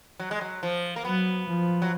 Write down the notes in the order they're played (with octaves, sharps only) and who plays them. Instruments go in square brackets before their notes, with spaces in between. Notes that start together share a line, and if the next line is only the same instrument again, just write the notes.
[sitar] F#3
G#3
F#3
F3
A#3
[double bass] F#3 [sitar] B3
[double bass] F3
[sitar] F#3